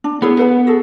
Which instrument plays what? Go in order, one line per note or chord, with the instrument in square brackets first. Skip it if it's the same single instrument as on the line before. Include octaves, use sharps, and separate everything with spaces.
[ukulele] D4
[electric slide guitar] B3 [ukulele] E4 G#4 C#5
[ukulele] B4 F#5 B5
F#4 G#4 A4